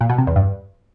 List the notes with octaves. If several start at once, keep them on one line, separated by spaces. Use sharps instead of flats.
A#2
B2
C3
E2
G2